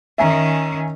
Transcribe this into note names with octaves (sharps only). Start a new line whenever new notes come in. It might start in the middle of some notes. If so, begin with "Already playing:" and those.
D#3 C#4 E5 G#5 A#5